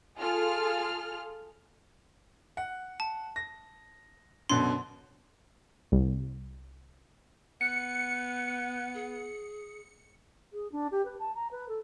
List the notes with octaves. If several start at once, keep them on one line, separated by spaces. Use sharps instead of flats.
F4 G#4 A4 F6
F#5
A5
A#6
F#2 B2 D3 C6
C2
B3 F#6 C#7
G#4
G#4
D4
G4
B4
A5
A#5
B4
A4